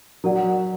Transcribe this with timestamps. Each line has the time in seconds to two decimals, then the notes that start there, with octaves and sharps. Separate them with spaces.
0.24 F#3 A#4 D5 F#5